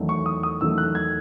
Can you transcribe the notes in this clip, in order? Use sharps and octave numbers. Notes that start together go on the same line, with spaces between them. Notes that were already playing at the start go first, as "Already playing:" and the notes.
Already playing: E2 D#3 F#3 A3
C#6
D#6
D#6
E2 D#3 F#3 A3 E6
F#6
G#6